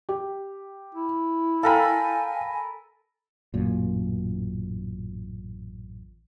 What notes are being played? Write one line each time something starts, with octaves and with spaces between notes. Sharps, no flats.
G4
E4
A4 A#4 F5 G5 G#5 B5
A1 F#2 A#2